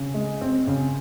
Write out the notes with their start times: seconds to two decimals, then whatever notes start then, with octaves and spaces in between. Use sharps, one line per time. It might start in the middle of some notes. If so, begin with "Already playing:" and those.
Already playing: C#3
0.14 G#3
0.41 C4
0.67 C#3